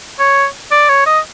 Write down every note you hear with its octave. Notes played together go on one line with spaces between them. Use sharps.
C#5
D5
C#5
D#5